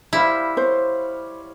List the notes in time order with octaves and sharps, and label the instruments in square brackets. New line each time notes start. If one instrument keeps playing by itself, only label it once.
[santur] G3 C5 F5 [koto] E4
[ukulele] C5 [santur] C#5